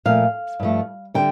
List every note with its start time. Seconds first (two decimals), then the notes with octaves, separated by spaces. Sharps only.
0.05 A#2 F3 A3 F5
0.60 G2 F3 A3
1.14 D3 G3 G5